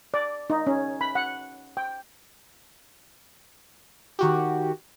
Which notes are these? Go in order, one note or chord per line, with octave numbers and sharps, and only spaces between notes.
D5
D#4
C#4
B5
F#5
G5
D#3 F#4 G4